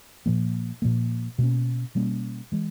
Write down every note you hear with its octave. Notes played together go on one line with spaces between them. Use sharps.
A#2 F3 A#3
A#2 F3 A#3
B2 G3 A#3 C#4
B2 G3 A#3 C#4
E3 G#3